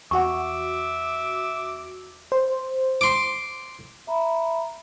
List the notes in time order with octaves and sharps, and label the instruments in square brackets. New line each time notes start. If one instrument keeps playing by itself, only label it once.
[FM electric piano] E2 F#4 [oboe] E5 [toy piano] F#5 C#6 [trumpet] D6
[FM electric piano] C5
[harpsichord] C6 D6
[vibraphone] E5 A#5 B5